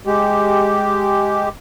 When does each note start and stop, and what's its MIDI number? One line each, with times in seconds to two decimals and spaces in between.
0.06 1.49 56
0.06 1.49 67